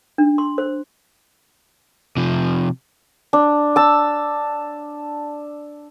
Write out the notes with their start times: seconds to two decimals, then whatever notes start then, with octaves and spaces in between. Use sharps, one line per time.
0.18 D4
0.38 C6
0.58 C5
2.17 C3 F3
3.33 D4
3.76 A5 E6